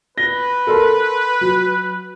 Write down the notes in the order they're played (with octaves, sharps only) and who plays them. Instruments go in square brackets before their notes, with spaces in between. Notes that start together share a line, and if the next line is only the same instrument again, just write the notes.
[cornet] B4 [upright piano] A#6 G7
[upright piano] A4 A#4 C6
F#3